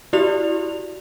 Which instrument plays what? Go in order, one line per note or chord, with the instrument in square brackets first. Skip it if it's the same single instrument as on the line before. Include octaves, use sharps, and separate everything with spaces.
[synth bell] E4 F#4 G4 D5 F7